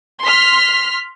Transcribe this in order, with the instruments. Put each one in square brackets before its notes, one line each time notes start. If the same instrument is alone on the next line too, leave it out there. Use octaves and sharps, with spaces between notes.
[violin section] C6 F6 B6